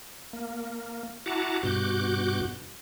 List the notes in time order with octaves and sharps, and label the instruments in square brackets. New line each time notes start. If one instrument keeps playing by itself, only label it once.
[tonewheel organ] A#3
E4 F#4 F#5 A5 A#5 D6
G2 B2 F#4 D6 F#6 G6